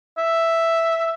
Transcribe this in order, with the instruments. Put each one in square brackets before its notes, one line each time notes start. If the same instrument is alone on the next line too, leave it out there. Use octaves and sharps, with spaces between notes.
[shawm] E5